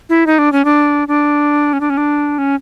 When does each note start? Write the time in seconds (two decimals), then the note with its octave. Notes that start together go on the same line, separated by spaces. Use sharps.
0.09 E4
0.27 D#4
0.39 D4
0.52 C#4
0.65 D4
1.08 D4
1.73 C#4
1.81 D4
1.90 C#4
1.97 D4
2.38 C#4